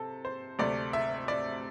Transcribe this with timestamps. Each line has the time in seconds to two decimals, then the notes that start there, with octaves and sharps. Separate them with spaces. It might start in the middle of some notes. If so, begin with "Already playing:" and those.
Already playing: C3 A4
0.25 C5
0.59 D2 C3 A3 D5
0.93 E5
1.28 D5